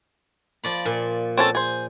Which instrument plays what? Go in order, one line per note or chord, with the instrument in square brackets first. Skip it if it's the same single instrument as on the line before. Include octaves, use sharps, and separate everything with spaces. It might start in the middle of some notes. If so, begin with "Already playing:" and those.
[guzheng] F3 D5 B5
A#2
[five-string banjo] C4 C#4 A4
G#4 C5